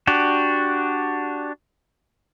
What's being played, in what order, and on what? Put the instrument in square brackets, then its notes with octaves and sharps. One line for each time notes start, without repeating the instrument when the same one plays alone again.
[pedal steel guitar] D4 F#4 G4